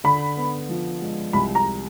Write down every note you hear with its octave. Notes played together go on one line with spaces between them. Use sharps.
D3 B5
B3
F3
G#3
C2 B5
A#5